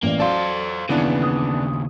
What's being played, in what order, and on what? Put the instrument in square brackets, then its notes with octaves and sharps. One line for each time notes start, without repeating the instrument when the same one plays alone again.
[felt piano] A1 D5 [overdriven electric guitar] A#3
[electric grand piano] F#3 D5 [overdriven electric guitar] A4 C5 [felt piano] F5
[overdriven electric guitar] D#2 C#3 [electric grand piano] E3 B3 D4
[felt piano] D#6